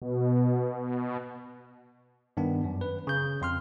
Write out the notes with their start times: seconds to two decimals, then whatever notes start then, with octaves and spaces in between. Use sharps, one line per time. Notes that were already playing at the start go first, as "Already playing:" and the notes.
0.02 B2
2.37 G2 D#3 B3 D4
2.64 F#2
2.81 B4
3.07 C#3 G6
3.41 F2 C6 F6